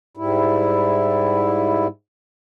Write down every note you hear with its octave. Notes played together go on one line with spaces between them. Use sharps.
G#2 G3 E4